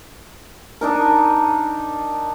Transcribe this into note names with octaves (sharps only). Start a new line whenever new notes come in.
D4 D#4 A#4